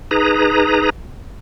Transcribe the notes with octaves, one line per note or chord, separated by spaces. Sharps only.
D#4 G#4 B4 A#5